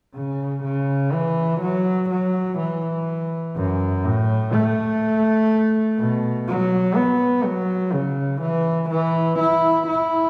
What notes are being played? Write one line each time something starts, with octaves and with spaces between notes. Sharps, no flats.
C#3
C#3
E3
F#3
F#3
E3
F#2
A2
A3
B2
F#3
B3
F#3
C#3
E3
E3
E4
E4